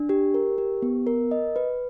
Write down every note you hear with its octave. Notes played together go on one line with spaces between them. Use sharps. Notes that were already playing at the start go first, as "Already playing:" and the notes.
Already playing: D4
G4
A#4
G4
B3
A#4
D#5
B4